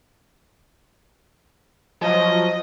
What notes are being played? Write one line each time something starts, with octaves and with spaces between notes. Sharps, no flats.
F3 F#3 D#5